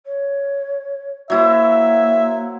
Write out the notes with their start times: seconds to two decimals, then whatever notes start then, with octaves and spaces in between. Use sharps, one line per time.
0.06 C#5
1.30 F#3 A#3 E4 C5 E5